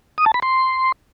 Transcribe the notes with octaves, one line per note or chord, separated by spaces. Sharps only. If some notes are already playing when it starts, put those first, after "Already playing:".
D#6
A5
B5
C6